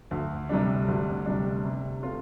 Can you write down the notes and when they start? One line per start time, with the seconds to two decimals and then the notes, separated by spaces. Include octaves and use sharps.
0.11 D2
0.49 C3 G3 D4
0.88 D2
1.26 C3 G3 D4
1.64 C3
2.03 A3 C4 F4